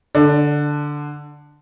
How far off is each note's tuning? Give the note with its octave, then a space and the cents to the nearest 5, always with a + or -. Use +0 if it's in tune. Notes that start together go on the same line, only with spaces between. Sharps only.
D3 +0 D5 +20